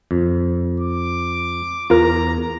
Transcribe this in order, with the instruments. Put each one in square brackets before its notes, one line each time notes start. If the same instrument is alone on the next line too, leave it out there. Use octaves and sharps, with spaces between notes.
[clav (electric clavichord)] F2
[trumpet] D6
[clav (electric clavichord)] E2 [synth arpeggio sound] F4 A#4 [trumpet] A#5